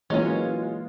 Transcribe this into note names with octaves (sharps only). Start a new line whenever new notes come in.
E3 F#3 G#3 A#3 C#4 F4